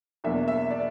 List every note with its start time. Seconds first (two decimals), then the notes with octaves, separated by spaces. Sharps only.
0.24 E2 B2 F#3 A#3 D4 E5
0.48 E5
0.71 D5